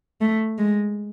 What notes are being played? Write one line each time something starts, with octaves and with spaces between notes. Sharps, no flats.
A3
G#3